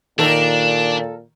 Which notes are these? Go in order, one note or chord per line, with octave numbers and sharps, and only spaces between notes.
A#2 D#3 D4 A4 A#4